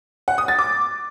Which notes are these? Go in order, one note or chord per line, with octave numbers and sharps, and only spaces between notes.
F#5
D#6
A6
D6